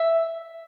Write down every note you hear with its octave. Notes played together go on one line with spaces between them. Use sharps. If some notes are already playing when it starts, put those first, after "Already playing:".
Already playing: E5